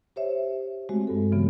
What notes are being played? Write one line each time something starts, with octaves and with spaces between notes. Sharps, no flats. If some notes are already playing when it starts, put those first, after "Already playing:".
G4 C5 C#5 E5
G#3 A3 C4 F#4
G2 A4
C#3 E3 F#3 B3